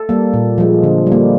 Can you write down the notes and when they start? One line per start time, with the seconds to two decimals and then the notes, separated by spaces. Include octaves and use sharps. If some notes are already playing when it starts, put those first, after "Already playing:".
Already playing: A4
0.09 G3 A#3
0.34 A#2
0.58 F3 G#3
0.83 D3
1.07 G3
1.12 A#3